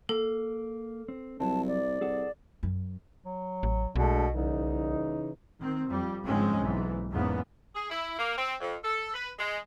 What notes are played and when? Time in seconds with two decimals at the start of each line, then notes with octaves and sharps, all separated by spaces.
0.09 A#3 A4
1.08 C4
1.40 C2 F#3 C4 A5
1.67 D5
2.01 C2 G#4 A4 F#5
2.63 F#2
3.26 F#3
3.63 A1
3.96 B1 B2 G#3 A3 D4
4.34 C2 C#3 E3 D#4
5.59 D#3 C4
5.88 F2 G3
6.25 G1 G#2 F3 G#3 C4 C#4
6.59 B1 G#2 E3
7.11 E2 G#2 C#3 A#3 B3
7.75 G#4
7.90 E4
8.18 A#3
8.37 C4
8.61 F2
8.84 A4
9.14 B4
9.39 G#3